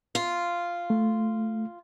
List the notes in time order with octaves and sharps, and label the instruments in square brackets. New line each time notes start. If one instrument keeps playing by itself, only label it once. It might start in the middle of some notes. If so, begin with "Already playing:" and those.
[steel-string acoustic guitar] F4
[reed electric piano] A3